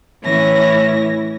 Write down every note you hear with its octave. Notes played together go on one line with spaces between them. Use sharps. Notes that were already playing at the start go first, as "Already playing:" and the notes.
A2 E3 C#4 E4 C#5 A#6